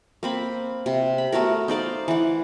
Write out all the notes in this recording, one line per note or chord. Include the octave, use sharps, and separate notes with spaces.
A#3 C4 B5
C3
B5
A3 B3 F#4 A#4
D#4 C5 D5 F5
E3 F#5